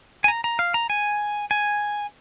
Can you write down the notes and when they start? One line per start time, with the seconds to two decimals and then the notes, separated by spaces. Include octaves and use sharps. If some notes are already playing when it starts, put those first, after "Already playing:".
0.24 G#5
0.28 A#5
0.44 A#5
0.59 F5
0.74 A#5
0.90 G#5
1.51 G#5